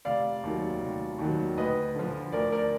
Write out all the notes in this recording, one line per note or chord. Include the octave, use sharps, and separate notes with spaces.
F1 D5 F5
D#2 D#3 F#3
F1
D#2 D#3 F#3
D2 B4 D#5
D3 F3
D2 A#4 D5
A#4 D5